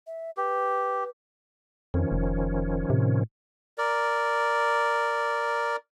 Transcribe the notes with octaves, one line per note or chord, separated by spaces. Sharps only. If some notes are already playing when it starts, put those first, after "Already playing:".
E5
G4 B4
F2 D#3 F3 C#4
F1
A2 C3
A#4 D5